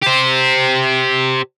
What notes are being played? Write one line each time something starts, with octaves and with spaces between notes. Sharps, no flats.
G4 C5